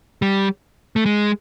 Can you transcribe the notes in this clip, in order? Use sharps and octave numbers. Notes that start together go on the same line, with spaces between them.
G3
A3
G#3